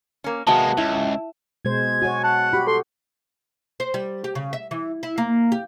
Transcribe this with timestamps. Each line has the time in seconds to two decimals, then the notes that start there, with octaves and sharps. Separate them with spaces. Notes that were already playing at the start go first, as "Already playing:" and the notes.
0.24 A#3 C#4
0.47 C3 G#3 A#3 B3 F#4 A5
0.77 C#2 E4
1.65 B2 G#3 C5 G#6
2.02 F#4 C#5 G#5
2.23 F#5 A5
2.53 F#4 G4 B5
2.67 A4 C6
3.80 C5
3.94 G3
4.24 G4
4.35 C#3
4.53 E5
4.71 E3
5.03 E4
5.18 A#3
5.52 G4